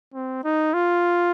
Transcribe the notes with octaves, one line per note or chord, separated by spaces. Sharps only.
C4
D#4
F4